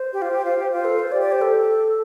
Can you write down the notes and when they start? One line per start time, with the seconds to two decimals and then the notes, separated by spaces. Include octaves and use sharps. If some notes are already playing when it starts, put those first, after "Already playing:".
Already playing: C5
0.13 G4
0.22 F4
0.33 G4
0.45 F4
0.59 G4
0.72 F4 C5
0.85 A4
0.99 C5
1.12 G4 D5
1.22 D5
1.32 C5
1.42 A4